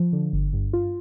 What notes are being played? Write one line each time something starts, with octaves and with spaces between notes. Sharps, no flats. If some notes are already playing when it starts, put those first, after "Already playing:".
Already playing: F3
D3
G1
G2
F4